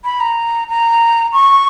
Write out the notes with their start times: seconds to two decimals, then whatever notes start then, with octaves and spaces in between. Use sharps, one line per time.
0.04 B5
0.20 A#5
0.69 A#5
1.33 C#6